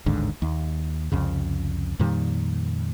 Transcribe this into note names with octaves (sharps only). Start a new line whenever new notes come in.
A1 D#2 G#2 D3
D#2
C2 F2 C#3
F2 A#2 D#3 G3